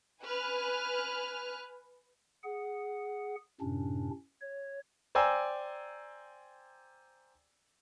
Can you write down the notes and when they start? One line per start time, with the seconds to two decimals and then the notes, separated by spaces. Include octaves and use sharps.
0.24 B4 G#5 F6 F#6
2.44 G#4 F#5
3.61 F#2 A2 C3 C#4 D4
4.41 C#5
5.15 C5 D5 G5 G#5 A#5 E6